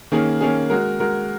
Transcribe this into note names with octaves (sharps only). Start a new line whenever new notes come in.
D#3 A#3 C#4 G#4
D#3 A#3 C#4 G#4
G#3 F#4 A#4
G#3 F#4 A#4